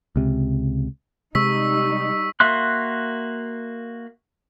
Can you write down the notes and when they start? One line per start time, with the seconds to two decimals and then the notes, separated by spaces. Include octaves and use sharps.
0.16 C#2 C3
1.35 C3 G3 G#3 D#4 C#6 E6 B6
2.40 A#3 F#4 E5 C6 F#6